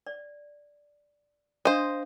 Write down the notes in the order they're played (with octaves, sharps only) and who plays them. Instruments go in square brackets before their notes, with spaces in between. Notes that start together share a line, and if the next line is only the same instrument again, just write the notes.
[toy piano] D5
[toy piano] D4 F5 [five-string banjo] C5 D#5